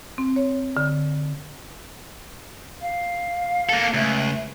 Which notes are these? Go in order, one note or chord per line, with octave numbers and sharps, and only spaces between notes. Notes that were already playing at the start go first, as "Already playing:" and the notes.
C4
C#5
D3
F5
A#3 A4
C#2 A3